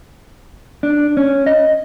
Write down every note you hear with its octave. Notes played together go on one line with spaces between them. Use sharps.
D4
C#4
D#5